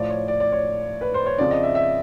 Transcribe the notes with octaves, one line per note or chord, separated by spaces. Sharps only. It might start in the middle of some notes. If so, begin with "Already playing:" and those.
Already playing: A2 F3 D5
C#5
D5
D5
C#5
B4
C5
C#5
F2 C#3 F3 D5
D#5
E5
E5